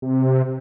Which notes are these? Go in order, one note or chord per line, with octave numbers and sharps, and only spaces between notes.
C3